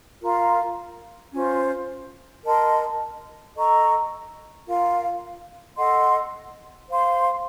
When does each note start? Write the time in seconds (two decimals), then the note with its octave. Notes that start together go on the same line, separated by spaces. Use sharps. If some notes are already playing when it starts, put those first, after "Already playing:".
0.20 F4 A#4 F5 A#5
1.32 C#4 F4 C5
2.44 A#4 D#5 A5 C6
3.54 A4 D#5 A#5 C#6
4.66 F4 A#4 F5
5.77 A4 D#5 F#5 C6
6.89 C5 F5 C6